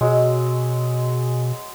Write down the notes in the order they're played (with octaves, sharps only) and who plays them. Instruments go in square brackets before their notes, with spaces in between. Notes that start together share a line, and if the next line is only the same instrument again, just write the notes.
[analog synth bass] B2 [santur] F#3 G#3 E6